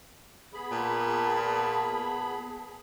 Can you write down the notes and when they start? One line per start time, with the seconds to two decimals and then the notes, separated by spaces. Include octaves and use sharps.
0.54 B3 G#4 B5
0.71 A#2 A5